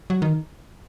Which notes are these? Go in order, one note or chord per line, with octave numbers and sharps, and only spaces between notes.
F#3
D#3